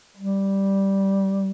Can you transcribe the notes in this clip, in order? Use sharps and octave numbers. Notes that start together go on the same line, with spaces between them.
G3